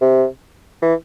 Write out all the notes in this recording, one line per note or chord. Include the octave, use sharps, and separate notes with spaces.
C3
E3